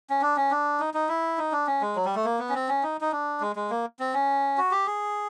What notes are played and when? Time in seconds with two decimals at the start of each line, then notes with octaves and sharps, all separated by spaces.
0.10 C#4
0.22 D4
0.37 C#4
0.51 D4
0.80 D#4
0.94 D#4
1.09 E4
1.38 D#4
1.52 D4
1.67 C#4
1.82 G#3
1.96 F#3
2.05 G3
2.16 A3
2.25 A#3
2.39 B3
2.49 C#4
2.55 C4
2.69 C#4
2.83 D#4
3.01 D#4
3.12 D4
3.41 G#3
3.56 G#3
3.70 A#3
3.99 C4
4.14 C#4
4.58 F#4
4.71 G4
4.87 G#4